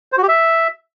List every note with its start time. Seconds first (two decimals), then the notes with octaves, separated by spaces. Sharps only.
0.12 C5
0.18 F#4
0.23 G4
0.28 E5